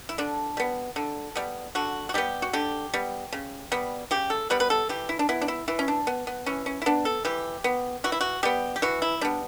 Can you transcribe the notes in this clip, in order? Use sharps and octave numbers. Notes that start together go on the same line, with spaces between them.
E4
D3 D4
G3 B3
D3
G3 B3
D3 F#4
F#4
G3 B3 G4
F#4
D3 G4
G3 B3
C#3
G3 B3
C#3 G4
A4
G3 B3 B4
B4
A4
E3 G4
E4
D4
B3 E4
D4
E4
E3 E4
C#4
D4
B3
B3
E3 C#4
C#4
E4
B3 D4
A4
E3 G4
B3
E3 F#4
E4
F#4
G3 B3 G4
G4
E3 F#4
E4
G3 B3 D4